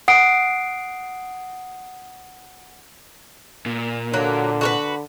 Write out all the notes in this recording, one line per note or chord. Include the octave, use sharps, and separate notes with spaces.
F#5 D#6 C7 D7
A#2
D3 F#3 A#3
F#4 A#4 B4